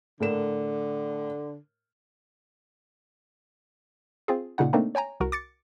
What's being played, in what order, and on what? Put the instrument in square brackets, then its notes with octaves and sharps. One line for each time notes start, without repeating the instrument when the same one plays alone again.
[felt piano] A2 A#4 E7 [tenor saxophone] D3
[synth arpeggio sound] C4 F4 G#4
A#2 C#3 D#4 F#5
A3 A#3 C4 D4 D#4
C#5 G5 G#5 A#5
C2 F#4 A#4
D6 A6 C#7